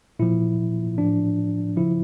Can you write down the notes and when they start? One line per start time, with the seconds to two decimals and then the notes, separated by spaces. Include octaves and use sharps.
0.19 A#2 F3 E4
0.98 A2 F3 D4
1.77 C#3 F3 E4